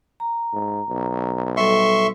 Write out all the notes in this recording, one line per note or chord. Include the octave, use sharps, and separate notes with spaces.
A#5
G#2
B1
G3 A4 E5 C6 C#6